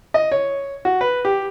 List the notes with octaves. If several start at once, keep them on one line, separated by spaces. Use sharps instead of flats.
D#5
C#5
F#4
B4
G4